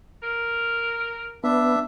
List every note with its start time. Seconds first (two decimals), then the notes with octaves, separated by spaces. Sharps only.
0.22 A#4
1.44 B3 D4 E5